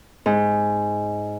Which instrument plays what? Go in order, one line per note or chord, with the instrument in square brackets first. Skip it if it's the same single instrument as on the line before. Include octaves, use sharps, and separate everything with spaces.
[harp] G#2